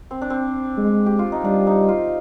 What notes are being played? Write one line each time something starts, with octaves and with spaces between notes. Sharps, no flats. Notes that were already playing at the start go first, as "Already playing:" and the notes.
C4
D4
C4
G#3
G4
F4
D#4
G3 D4
D#4
F4